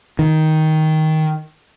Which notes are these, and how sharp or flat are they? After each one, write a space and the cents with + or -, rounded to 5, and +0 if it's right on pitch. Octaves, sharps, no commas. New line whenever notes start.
D#3 +10